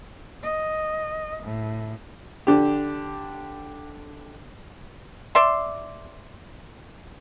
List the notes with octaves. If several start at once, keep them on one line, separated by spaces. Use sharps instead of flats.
D#5
A2
D3 D4 G4
D5 E5 C6